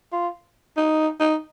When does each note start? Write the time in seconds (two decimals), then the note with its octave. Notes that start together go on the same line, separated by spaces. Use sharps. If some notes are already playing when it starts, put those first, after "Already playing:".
0.13 F4
0.77 D#4
1.20 D#4